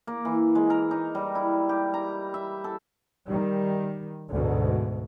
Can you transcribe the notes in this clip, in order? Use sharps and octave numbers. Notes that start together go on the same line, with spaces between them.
A#3
E3
G#3
A#4
D#4
G3
E4
G4
A#5
E5
A4
D#3 G3
D2 G#2 B2